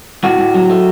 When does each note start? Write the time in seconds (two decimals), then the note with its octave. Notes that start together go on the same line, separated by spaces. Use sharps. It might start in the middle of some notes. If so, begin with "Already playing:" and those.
0.24 A2 F#4
0.39 A2
0.54 F#3
0.70 A3